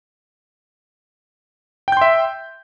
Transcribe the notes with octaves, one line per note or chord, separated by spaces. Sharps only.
E5 G5 C6 G6